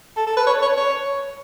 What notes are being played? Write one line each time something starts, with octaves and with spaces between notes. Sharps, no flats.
A4
A4
B4
C#5
C#5
C#5